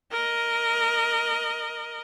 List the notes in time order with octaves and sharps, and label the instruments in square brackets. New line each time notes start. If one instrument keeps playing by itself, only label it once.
[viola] A#4 D#5